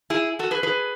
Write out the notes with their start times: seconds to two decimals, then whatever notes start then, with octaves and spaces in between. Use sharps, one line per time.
0.10 E4 G#4
0.39 F#4 A4
0.51 G#4 B4
0.63 G#4 B4